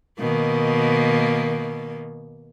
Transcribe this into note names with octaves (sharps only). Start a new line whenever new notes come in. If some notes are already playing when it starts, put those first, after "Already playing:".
B2 D#3 A#3